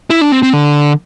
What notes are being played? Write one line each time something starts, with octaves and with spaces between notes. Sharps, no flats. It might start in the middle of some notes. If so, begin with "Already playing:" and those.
E4
D4
C4
C4
D3